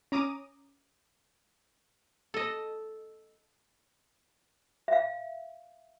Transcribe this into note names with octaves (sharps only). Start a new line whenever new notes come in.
C#4 A#5 D6 D#6 D#7
A4 D#5
E5 F5